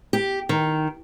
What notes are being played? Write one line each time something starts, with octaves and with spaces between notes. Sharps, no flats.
G4
D#3